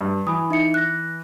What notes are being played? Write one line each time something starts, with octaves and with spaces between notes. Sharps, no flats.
G2
E3 G#5 B5 D#6
D#4 E5 C#7
F#6 A#6